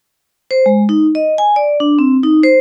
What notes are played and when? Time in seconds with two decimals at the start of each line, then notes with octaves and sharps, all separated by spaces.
0.51 C5
0.66 G#3
0.89 D#4
1.15 D#5
1.38 G#5
1.56 D5
1.80 D4
1.99 C4
2.24 D#4
2.43 C5